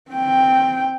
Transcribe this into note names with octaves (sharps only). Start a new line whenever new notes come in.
C4 G5